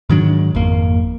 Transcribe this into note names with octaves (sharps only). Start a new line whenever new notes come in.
G#2 D#3 F#3 D4
G#1 F2 A#3